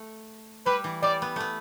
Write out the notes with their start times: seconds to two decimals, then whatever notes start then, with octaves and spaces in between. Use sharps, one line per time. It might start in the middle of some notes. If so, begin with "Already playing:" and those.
Already playing: A3
0.66 G3 B4
0.84 E3
1.03 G3 D5
1.22 B3
1.36 A3 B3